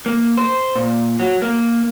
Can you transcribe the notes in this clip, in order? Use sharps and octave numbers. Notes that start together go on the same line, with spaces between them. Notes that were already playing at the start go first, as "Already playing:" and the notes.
A#3
C5
A#2
F#3
A#3